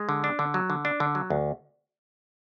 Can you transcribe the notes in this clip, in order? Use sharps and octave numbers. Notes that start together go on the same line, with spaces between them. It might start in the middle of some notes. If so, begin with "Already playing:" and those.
Already playing: G#3
D3
D4
D3
F#3
D3
D4
D3
F#3
D2